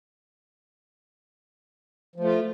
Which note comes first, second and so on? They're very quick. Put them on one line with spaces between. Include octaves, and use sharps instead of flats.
F3 A3 F4